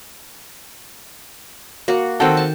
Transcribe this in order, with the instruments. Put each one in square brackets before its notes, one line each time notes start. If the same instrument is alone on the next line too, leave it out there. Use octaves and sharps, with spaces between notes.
[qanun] A#3 F#4 F#5
[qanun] D#3 G5 [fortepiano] C4 F#4 A4
[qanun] A5